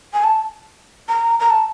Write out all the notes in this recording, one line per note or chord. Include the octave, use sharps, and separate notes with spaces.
G#5
A5
A#5
A#5
A5